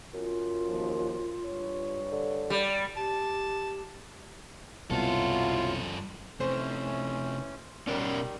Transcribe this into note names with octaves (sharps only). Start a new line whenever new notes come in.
F#2 F4
D#2 F3
G2 C#5
D3
G3 D5
G4 A5
C2 F#2 B2 F#3 E4 F4 A4
C3 E3 A3 C#4 C5
B2 D#3 G3 C#4 A#4 C#5 D5